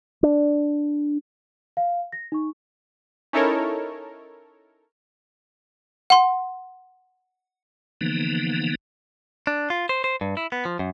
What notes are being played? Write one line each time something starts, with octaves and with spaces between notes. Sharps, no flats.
D4
F5
A#6
D#4 C#6
C#4 D#4 E4 A4 A#4 C#5
F#5 C6
D3 E3 F3 A#3 B3 D#4
D4
F4
C5
C5
G2
E4
B3
F3
F#2